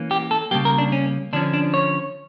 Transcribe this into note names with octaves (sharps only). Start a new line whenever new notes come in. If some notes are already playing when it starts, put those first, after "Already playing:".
Already playing: E3 A#3 C#4
G4
A4
C#3 G3 A#3 G4
A#4
D4
C#4
D3 F3 C#4 D4
D4
C#5